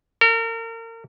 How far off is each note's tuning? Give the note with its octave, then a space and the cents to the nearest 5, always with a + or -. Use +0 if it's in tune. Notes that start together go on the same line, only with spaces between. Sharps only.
A#4 -35